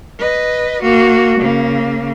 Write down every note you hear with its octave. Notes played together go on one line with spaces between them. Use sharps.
B4 D#5
A#3 F#4
C#3 A#3